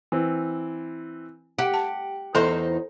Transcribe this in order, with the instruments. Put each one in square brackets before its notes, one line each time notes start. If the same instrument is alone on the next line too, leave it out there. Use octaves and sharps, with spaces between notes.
[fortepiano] E3 C4
[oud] G4 [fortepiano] F#5
[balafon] A5
[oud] E2 D#4 C5 [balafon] A4